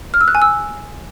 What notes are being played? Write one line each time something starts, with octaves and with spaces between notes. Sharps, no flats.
F6
E6
F#6
G#5
E6